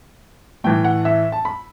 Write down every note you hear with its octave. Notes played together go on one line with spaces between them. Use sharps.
A2 E3 A3 G5
F#5
E5
A5
B5